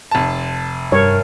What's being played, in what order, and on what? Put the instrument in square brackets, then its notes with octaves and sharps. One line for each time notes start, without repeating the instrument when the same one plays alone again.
[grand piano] F1 A5
[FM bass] G2 [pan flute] A#4 [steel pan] C#5